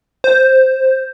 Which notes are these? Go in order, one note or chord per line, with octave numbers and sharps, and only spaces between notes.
C5